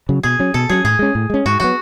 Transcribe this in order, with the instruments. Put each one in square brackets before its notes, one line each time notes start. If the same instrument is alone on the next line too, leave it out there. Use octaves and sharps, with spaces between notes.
[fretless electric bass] C#3 F#3
[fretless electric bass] B2 [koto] G#4
[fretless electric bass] F#3 C#4
[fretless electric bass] B2 [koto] A4
[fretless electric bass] F#3 C#4 [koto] G#4
[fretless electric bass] A2 [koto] G#4
[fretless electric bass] G#3 C#4
A2
G#3 C#4
[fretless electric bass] G#2 [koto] F#4
[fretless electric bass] F#3 B3 [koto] F#4